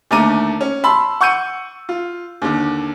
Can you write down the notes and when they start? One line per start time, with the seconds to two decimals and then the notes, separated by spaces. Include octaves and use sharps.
0.11 D#2 D3 A3 A#5 D6 D#7
0.61 C#4
0.84 A5 B5 C6 E6
1.21 F#5 C#6 E6 G6 C#7 D#7
1.89 F4
2.42 D#2 D3